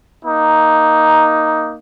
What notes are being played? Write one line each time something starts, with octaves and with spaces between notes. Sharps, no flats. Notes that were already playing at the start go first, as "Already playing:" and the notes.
A#3 D#4